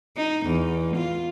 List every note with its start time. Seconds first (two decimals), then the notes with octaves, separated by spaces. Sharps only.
0.17 D#4
0.46 E2
0.97 F4